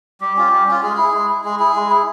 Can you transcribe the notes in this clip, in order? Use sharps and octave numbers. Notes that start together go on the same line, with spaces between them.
G3 G4
C#4 F4
G3
C#4 F4
G#3 G#4
E4
G#3
E4
G#3 G#4
E4 G#4
G#3
E4